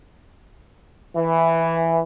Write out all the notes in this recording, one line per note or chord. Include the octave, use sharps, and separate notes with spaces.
E3